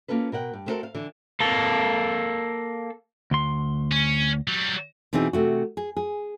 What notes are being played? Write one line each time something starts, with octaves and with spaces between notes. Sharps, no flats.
A#3 C#4 F4 A4 B4
B2 A#4 F#5 G5
G2
A3 B3 C4 F#4 A4 A#4
F5
D3 E3
A#3 A4
D2 C6
C#4
F#3 G3
B2 E3 C4 D#4 G#4
C3 A3 F#4
G#4
G#4